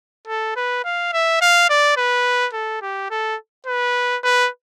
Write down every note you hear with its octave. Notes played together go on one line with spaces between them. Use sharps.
A4
B4
F5
E5
F5
D5
B4
A4
G4
A4
B4
B4